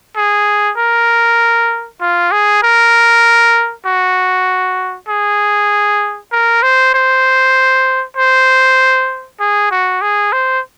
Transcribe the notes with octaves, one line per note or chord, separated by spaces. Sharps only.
G#4
A#4
F4
G#4
A#4
F#4
G#4
A#4
C5
C5
C5
G#4
F#4
G#4
C5